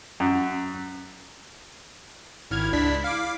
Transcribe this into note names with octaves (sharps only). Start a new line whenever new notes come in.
F#2
G#1 E4 F6 G#6
C#2 D4 B6
F5 D6